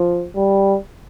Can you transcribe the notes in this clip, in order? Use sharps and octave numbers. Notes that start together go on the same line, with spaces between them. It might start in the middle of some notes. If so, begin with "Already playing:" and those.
Already playing: F3
G3